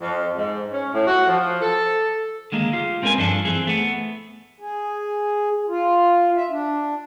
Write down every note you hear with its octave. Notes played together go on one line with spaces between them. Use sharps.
F2
G#2
C#4
A2
F#4
F3
A4
D3 D#3 G#3 A#3
F4 G4
G#3 C4 C#4 A#4 B4 G#5
G2 F3 D4 A4
E3 C4 G#4
A3 B3
G#4
F4
E5
D4